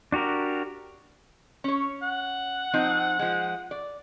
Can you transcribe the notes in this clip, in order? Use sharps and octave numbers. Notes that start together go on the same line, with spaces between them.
D4 F#4 G4 A#4
C#4 C#5
F#5
F3 C4 D#4
F3 G#3
D5